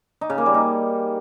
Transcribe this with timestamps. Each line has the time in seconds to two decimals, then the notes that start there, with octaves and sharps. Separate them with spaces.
0.21 D#4
0.30 C#3
0.38 A#3
0.46 G3
0.54 D#4